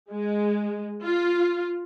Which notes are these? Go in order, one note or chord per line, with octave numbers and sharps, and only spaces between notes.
G#3
F4